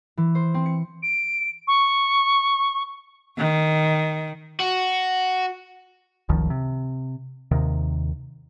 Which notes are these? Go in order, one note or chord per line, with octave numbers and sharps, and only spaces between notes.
E3
C5
C4
C#7
D7
C#6
D#3
F#4
F#1 C#2 D#3 F3
C3
D#2 C3 D#3